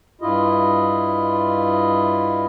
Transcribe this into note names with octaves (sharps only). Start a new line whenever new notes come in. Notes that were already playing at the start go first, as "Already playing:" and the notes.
G2 E4 F4 D#5